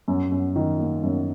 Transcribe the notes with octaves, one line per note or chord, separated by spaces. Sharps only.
F#2
F#2
D#3
A#3
F#2